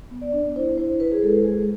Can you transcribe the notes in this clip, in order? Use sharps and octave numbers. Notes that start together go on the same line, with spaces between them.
B3
D5
D4
E4 C5
E4 C5
E4 B4
G#4
G#3 A4
G#3 G#4